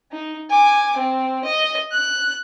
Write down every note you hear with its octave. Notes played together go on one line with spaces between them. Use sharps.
D#4
G#5 D6
C4
D#5
F#6